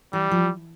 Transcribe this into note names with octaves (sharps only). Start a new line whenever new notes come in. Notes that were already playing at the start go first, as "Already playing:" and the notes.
E3 G3
F3